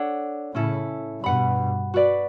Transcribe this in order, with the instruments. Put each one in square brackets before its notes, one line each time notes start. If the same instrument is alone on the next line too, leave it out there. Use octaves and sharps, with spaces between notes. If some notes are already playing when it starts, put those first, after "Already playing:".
Already playing: [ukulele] D4 A4 C#5 F#5
[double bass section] A2 C#3 [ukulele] C#4 E4 A4
[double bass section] G2 B2 [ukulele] B4 F#5 B5
[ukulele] F#4 B4 D5